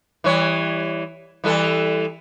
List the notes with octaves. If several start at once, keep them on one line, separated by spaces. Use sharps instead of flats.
E3 G3 C#5
E3 G3 A4